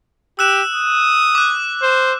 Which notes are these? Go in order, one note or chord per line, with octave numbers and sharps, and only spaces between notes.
G4 E6 F#6 E7
D#6
D6 F#6
C5